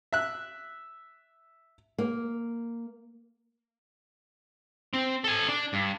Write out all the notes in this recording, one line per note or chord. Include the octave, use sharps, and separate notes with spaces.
E5 F#6
A#3
C4
A4 G#5
D4
G2